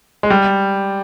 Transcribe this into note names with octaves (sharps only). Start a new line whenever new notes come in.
G#3
G3